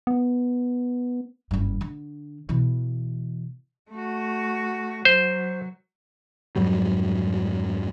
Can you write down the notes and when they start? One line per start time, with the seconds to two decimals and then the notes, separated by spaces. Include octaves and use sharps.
0.07 B3
1.51 F#1 G2
1.81 D3
2.49 B2 E3
3.91 A3 F#4
5.05 F#3 C5
6.56 F2 G#2 F#3 G3